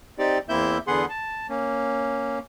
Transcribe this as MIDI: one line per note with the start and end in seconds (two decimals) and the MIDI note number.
0.18 0.38 60
0.18 0.38 63
0.18 0.38 67
0.18 0.38 74
0.49 0.78 40
0.49 0.78 58
0.49 0.78 60
0.49 0.78 64
0.49 0.78 76
0.49 0.78 91
0.87 1.05 40
0.87 1.05 50
0.87 1.05 59
0.87 1.05 68
0.87 1.05 78
0.87 1.05 84
1.10 1.47 81
1.49 2.39 58
1.49 2.39 61